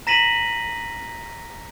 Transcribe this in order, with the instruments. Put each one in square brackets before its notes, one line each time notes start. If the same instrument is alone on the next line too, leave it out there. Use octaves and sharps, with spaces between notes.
[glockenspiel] A#5 A#6 B6 D#7 F#7